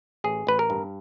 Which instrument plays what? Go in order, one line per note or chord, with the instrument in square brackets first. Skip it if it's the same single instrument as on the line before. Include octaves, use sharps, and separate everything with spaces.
[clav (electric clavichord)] A1 G#4
A1 B4
A#4
G2